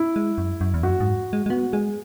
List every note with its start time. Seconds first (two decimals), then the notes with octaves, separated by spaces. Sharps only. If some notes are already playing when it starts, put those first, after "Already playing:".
Already playing: E4
0.16 G#3
0.38 F#2
0.61 F#2
0.74 E2
0.83 F#2 F#4
1.00 G#2
1.33 G#3
1.46 G#3
1.50 B3 F#4
1.73 G#3 G#4